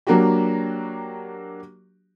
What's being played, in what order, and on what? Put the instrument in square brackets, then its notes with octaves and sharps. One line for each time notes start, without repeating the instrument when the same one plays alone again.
[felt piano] F#3 A#3 D4 F#4 G4